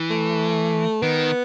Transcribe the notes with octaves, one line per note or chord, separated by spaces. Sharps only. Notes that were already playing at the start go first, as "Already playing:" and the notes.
Already playing: E3
A3
D#3 B3